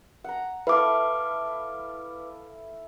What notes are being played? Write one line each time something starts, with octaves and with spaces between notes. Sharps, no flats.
F#5 A#5
E4 A4 B4 F5 D6